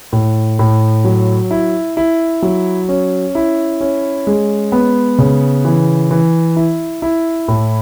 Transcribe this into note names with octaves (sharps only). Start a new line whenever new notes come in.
A2
A2
F#3
E4
E4
F#3
C#4
E4
C#4
G#3
B3
C#3
E3
E3
E4
E4
A2